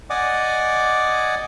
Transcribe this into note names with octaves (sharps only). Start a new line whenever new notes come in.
D5 D#5 F#5 G#5 D6 D#6